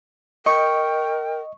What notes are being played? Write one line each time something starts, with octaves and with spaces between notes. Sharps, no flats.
A#4 D#5 G5 C#6